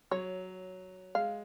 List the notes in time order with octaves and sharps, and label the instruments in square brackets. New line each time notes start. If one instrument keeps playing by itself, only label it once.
[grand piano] F#3 [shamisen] C#5
[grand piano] G#3 [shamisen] F5